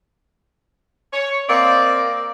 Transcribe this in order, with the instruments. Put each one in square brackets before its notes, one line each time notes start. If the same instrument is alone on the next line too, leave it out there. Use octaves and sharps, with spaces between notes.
[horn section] C#5
[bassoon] A#3 [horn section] C4 D5 D#5